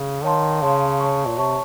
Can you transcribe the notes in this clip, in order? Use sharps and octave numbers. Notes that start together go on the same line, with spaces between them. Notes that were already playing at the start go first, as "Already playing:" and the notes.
Already playing: C#3
D#3 C#5 F5 A5 C6
C#3 C#5 F5 A5 C6
C#5 A5 C#6
A#2
C3 C#5 A5 C#6